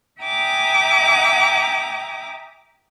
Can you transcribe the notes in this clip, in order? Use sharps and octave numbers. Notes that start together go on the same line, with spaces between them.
E5 G5 G#5 A#5 D6 D#6